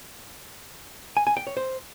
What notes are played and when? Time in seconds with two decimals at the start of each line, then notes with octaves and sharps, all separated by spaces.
1.17 G#5
1.27 G#5
1.37 G5
1.47 C#5
1.57 C5